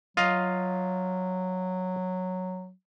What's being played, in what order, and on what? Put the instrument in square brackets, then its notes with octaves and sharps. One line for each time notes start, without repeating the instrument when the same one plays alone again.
[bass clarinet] F#3 [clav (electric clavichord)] F4 D#5 F5